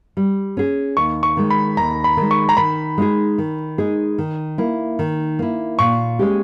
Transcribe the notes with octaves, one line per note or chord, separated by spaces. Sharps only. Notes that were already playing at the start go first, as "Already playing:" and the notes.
G3
C#4 G#4
D#2 C#6
C#6
D#3 G#3
B5
D#2 A#5
B5
D#3 G#3
C#6
A#5
D#3 B5
G#3 D#4 G#4
D#3
G#3 D#4 G#4
D#3
A#3 E4
D#3
A#3 E4
A#2 C#6
G#3 C#4 G4